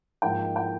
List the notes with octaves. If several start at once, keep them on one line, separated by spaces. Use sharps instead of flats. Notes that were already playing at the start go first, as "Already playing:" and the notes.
G#2 F3 A#3 D#4 G5
G5